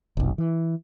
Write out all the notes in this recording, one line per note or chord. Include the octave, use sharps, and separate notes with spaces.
F1 B1
E3